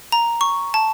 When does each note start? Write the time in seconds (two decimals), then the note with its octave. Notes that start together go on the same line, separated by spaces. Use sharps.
0.12 A#5
0.41 C#6
0.74 A5